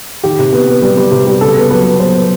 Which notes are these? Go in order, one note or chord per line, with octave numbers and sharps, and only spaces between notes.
D#3 G4
C3
B3
B3
G3
G3
C3
G3
C#3 A4
B3
F#3 B4
B3
B3 C5
B3